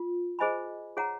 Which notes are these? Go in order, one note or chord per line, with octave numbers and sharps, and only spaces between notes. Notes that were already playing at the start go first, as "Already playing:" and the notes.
Already playing: F4
G#4 C5 D#5 G#5 B5
G#4 C#5 F#5 A#5